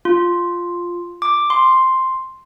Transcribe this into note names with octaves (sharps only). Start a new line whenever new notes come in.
F4
D6
C6